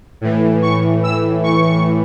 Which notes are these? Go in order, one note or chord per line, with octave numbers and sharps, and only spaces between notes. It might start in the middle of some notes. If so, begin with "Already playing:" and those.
A2 E3
C#6
E6
C#6